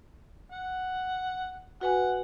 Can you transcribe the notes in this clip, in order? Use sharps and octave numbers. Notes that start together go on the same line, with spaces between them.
F#5
F#4 B4 F#5 G#5